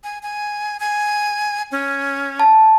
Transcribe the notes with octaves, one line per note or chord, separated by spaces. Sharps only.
G#5
G#5
G#5
C#4
A5